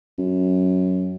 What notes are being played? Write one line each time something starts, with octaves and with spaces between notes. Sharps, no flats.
F#2